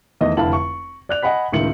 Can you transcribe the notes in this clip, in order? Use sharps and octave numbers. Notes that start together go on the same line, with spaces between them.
E2 D#3 A3 D#5
F1 D3 E4 F5 A5 F#7
C#6
D5 F#6 F7
D#5 F#5 G#5 B5 B6
C#2 A2 D#3 C#7 F#7